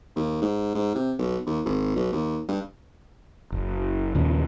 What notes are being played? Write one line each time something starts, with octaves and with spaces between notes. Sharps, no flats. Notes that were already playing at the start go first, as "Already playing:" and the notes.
D#2
G#2
G#2
C3
B1
D#2
G#1
B1
D#2
G2
F#1
D#2 A#2 C#3